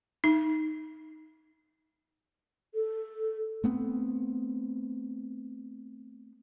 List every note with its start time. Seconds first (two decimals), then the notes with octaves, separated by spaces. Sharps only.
0.24 D#4
2.74 A4
3.64 A3 B3 C4